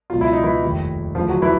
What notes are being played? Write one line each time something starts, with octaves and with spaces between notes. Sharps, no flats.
C#2 B2 F#3 F4
E4
D#4
E3 E4
F1 D#2 D#3 G3
D2 C#3 E3 F3 F4
F#3 F#4
E3 E4